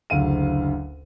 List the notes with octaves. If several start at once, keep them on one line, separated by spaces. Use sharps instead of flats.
F#1 D2 F5 D#7